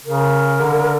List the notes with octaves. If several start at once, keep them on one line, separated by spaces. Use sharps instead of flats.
C#3 A#4
D3